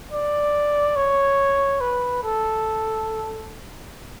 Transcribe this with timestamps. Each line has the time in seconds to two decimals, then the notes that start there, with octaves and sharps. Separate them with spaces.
0.12 D5
0.96 C#5
1.81 B4
2.24 A4